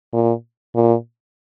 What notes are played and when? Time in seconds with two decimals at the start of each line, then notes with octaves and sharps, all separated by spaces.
0.13 A#2
0.75 A#2